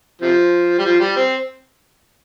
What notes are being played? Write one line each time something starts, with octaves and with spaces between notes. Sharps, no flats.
C3 F3
G3
F3
G3
C4